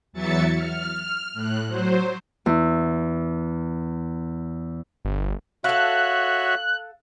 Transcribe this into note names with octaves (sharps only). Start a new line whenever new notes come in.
E2 E3 F#3 E5 A6 C#7
F6
A2 F#6
F#3 C5
E2 E4
G1
F#4 A4 C#5 E5 F5 F#6